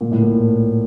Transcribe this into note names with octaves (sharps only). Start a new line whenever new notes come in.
A#2
A2
A#2